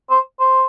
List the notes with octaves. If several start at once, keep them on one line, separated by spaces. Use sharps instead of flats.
C5
C5